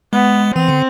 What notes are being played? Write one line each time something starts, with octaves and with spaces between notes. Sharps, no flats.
G#3 B3
E3 C4
D3